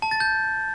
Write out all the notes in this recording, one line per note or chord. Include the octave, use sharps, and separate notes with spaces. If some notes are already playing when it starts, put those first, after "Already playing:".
A5
A6
G6